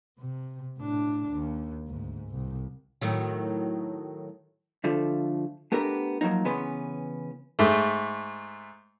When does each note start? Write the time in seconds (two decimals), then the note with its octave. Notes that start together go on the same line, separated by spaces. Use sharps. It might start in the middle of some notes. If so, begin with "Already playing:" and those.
0.18 C3
0.79 A2 D4
1.32 D#2
1.87 D2 G#2
2.30 C2
3.01 A2 D#3 F#3
4.84 D3 F3 A3
5.72 A3 B3 D4 G4 A#4
6.21 F3 F#3 G#3 A#3 D#4
6.45 C#3 E3 B3 C#4 B4 C6
7.59 G#2 A3